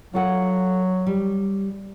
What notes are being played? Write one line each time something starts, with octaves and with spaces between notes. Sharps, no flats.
F#3 F4 A4 F#5
G3